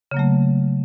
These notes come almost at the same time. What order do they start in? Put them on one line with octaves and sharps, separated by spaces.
C#3 A#3 F#3 A3